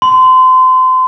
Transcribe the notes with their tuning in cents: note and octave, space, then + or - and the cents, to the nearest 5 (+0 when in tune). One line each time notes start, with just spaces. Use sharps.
C6 -30